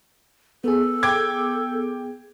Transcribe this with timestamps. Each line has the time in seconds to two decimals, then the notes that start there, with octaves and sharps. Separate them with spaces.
0.64 B3 G#4 A4
1.03 G5 D6 G#6